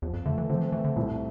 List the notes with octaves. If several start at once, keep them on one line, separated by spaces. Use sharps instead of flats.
E2 F3
F2
D3 A3
E3
D3 C4
F3
E3
E3 A3
D3
C2 A#2